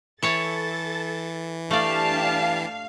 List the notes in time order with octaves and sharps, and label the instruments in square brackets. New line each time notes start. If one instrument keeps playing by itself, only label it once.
[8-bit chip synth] E3 [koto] E4 C#5 A5 [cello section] A4 [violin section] A6
[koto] A3 D5 [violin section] D4 G4 A5 [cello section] F5